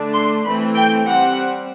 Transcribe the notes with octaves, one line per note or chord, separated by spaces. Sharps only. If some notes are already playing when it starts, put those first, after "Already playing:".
Already playing: D3 A3 D4
C6
E3 A3 C4 B5
G5
G3 C4 F#5